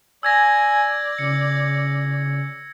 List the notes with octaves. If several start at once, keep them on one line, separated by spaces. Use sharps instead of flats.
D5 G#5 E6 G#6 A#6
C#3 C#7